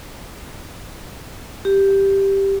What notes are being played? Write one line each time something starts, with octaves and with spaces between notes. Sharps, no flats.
G4